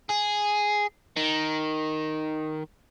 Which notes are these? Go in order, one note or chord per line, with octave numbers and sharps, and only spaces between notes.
G#4
D#3